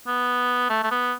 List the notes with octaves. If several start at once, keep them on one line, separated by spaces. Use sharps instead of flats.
B3
A3
A3
B3